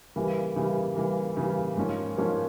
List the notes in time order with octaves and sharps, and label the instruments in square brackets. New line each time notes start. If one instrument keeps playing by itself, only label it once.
[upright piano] C#3 E3 G3 A#3
C#3 E3 G3 A#3
C#3 E3 G3 A#3
C#3 E3 G3 A#3
G#2 F3 A#3 C#4
G#2 F3 A#3 C#4